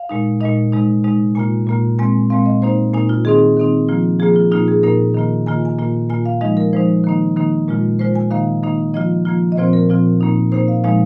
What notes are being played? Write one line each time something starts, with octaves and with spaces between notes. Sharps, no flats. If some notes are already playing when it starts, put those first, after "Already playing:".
Already playing: F5
A#2 G#3 D#4
A#2 G#3 D#4 D#5
C3 G#3 D#4
C3 G#3 D#4
A#2 A#3 F4 G#5
A#2 A#3 F4
A#2 G#3 C4 G#5
A#2 G#3 C4 F5
D#5
A#2 A#3 D#4 C5
A#2 A#3 D#4 G#5
F4
D#3 C4 D#4 G#4
D#3 C4 D#4
F3 A#3 F4
F3 A#3 F4 G#4
F4
A#2 A#3 D#4 F4
G#4
A#2 A#3 D#4 A#4
D#3 A#3 F4
D#3 A#3 F4 G#5
G#5
A#2 A#3 F4
A#2 A#3 F4 G#5
F5
F3 G#3 D#4 D#5
A#4
F3 G#3 D#4 C5
D#3 A#3 D#4
D#3 A#3 D#4
A#2 G#3 F4
A#2 G#3 F4 C5
G#5
D#3 A#3 D#4 F5
D#3 A#3 D#4
F3 A#3 F4 D#5
F3 A#3 F4
D#5
A#2 F3 C4 F4 C5
A#4
A#2 F3 C4 F4
A#2 A#3 D#4
A#2 A#3 D#4 C5
F5
A#2 F3 G#3 D#4 F5